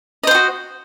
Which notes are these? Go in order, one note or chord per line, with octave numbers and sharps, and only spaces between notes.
F4 F#4 C5 D#5